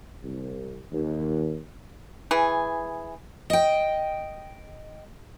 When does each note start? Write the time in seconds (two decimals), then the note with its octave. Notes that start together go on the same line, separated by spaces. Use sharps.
0.24 C2
0.92 D#2
2.31 E3 G#4
3.50 D#5 G5